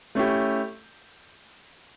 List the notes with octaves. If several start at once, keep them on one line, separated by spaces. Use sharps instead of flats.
A3 C#4 E4 G4